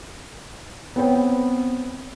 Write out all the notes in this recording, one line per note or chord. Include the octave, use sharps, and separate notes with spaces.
B3 C4 C#5 G5